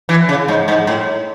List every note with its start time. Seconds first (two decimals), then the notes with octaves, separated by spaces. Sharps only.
0.09 E3
0.29 C#3
0.48 G#2
0.68 G#2
0.87 A2